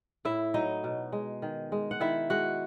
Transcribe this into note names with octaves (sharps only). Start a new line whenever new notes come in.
A2 E4 E5
F#3 D#4 D#5
B2
G#3
D#3
G#3
F#5
D#3 E4 E5
G#3 F#4 F#5